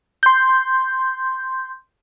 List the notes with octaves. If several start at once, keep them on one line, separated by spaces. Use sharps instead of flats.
C6 G6